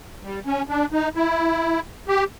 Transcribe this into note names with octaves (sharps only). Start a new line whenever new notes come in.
G3
C#4
D4
D#4
E4
G4